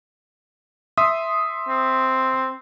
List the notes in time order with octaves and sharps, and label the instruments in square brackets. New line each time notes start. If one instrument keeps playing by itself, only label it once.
[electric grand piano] E5 C6 D#6
[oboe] C4